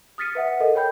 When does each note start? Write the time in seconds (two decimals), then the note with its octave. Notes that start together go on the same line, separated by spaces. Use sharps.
0.18 D#6 F6 A6 B6 C#7 D#7
0.35 B4 E5 F#5
0.60 A4 A#4 D#5
0.75 C#5 G5 B5 G6